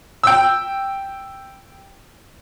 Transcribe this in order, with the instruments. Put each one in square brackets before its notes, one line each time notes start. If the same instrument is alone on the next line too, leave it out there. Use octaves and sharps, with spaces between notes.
[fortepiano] G5 E6